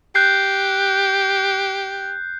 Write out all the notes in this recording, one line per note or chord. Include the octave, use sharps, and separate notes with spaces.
G4 F#6 G6 C7